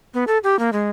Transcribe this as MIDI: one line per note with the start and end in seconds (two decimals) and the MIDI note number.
0.14 0.24 59
0.27 0.38 69
0.44 0.58 67
0.59 0.70 58
0.73 0.90 56